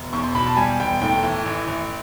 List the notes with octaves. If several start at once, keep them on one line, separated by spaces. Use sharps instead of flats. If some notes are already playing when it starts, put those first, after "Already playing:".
Already playing: E1
E2 C#6
C6
B2 B5
A5
G3 G#5
E1 G5
A2 G5
E3
A1
A1